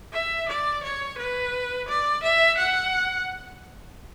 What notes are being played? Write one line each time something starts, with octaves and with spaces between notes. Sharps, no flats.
E5
D5
C#5
B4
D5
E5
F#5